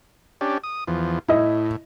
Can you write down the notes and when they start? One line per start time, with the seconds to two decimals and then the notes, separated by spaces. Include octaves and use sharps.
0.41 C#4 D4 G4
0.64 D#6
0.87 E2 F3
1.29 A2 E4 D#5 E5